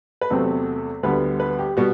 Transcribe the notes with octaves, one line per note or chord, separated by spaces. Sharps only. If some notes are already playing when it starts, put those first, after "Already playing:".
B4
E2 C3 F#3 A3 C4 A4
D2 D3 G3 B3 B4
B4
G4
B2 G3 B3 F#4